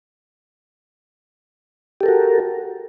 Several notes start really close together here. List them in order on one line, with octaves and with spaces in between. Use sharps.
G4 A4 A#4 F#4